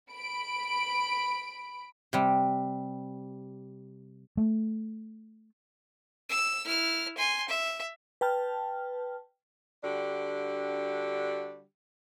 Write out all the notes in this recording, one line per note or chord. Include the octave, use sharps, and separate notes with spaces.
B5 D7
C3 G3
A3
E6
E4 F6
G#5 C6
E5
B4 G5 A5 F6
D3 G3 D4 F#4 G4